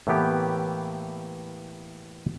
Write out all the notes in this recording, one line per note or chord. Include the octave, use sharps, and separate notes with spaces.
A2 E3 A#3 B3 G4